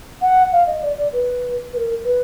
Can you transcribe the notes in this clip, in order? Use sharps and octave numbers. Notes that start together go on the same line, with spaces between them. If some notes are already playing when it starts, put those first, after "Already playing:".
F#5
F5
D#5
D5
D5
B4
B4
A#4
B4